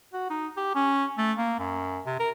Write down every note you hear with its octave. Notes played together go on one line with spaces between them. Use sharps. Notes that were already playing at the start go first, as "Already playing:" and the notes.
F#4
D#4
G4
C#4
A3
A#3
F#2
C3
A#4